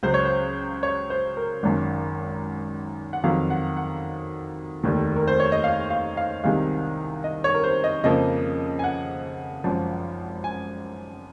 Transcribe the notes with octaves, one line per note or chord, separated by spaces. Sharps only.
C#2 C#3 F#3 C5
C#5
C5
C#5
C5
A#4
G#1 F#2 D#3
F#5
F2 D#3 F#3 F5
F#5
F#5
F1 D#2 D#3
A#4
C5
C#5
D#5
F5
F5
F5
C2 C3 D#3 G#3 F5
D#5
C#5
A#4
C5
D#5
F2 C#3 F3 A#3 D#5
G#5
F#5
G#1 F#2 F3
G#5